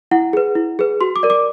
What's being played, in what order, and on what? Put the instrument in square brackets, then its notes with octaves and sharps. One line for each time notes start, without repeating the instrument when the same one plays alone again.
[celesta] E4 F#5
G#4 B4
E4
G#4 B4
F#4 C6
D6
A#4 D5
D6